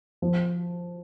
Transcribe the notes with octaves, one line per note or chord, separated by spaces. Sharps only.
F3